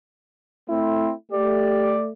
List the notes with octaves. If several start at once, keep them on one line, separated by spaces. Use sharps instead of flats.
A3 C4 E4
A3 G4 D5